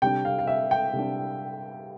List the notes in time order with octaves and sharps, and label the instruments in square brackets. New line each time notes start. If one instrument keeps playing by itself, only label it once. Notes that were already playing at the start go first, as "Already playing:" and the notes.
[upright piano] C3 G3 D4 G5
F5
F5
E5
G5
C3 G3 D4